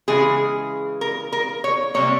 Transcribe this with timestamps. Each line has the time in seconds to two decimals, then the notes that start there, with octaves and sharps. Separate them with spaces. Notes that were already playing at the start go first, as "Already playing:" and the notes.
0.08 C#3 E3 G#3 G#4
1.01 A#4
1.32 A#4
1.64 C#5
1.94 C3 G3 A#3 C#5